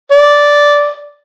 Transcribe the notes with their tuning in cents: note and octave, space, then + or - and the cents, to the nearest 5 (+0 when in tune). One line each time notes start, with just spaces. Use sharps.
D5 -10